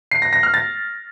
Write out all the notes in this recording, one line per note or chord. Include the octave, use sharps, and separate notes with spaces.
C7
A#6
A#6
F6
A6